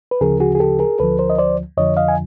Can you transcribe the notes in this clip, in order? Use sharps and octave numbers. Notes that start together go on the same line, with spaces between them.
B4
D2 C#3 F3 G#4 A#4
F#4 G#4
G#4
G4 A4
G#4 A#4
D2 D3 F3 A4 B4
A#4 C5
D#5
C5 D5
F2 D3 F3 C#5 D#5
D#5 F5
G#5